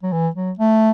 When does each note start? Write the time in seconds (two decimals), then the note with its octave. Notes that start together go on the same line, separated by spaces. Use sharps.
0.03 F#3
0.12 E3
0.36 F#3
0.59 A3